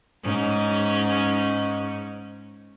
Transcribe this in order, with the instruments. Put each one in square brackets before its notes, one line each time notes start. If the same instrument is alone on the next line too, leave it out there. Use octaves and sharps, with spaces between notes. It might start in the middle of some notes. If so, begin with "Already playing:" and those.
[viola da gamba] G#2 C#4